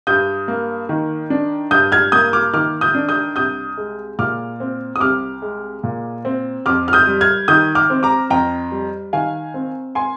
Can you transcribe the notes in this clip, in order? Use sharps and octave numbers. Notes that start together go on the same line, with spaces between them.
G2 D#6 G6
A#3
D#3
D4
G2 D#6 G6
F6 G#6
A#3 D#6 G6
D6 F6
D#3 D6 F6
D#6 G6
D4
D#6 G6
C2 D#6 G6
G#3
A#2 D6 F6
C4
D#6
C2 D6 F6
G#3
A#2
C4
F2 D6 F6
F6
D#6 G6
G3
F6 G#6
D#3 D#6 G6
D6 F6
C4
A#5 D6
F2 G5 A#5
G3
D#3 F5 G#5
C4
G#5 C6